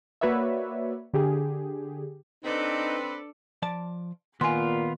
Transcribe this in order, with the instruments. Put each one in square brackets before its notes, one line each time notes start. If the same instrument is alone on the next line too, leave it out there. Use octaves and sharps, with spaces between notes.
[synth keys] A#3 F#4 B4 C#5 D5 E5
D3 G4 G#4
[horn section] C4 B4 [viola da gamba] D4 A4 D5 [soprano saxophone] D#4
[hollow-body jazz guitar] F3 D5 A5
[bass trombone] A#2 [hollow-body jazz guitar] D#3 [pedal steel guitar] B3 F4 [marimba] G#5 C6